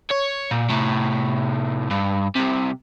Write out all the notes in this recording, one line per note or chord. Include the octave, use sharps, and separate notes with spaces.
C#5
A#2
A2 C3
G2
C2 C3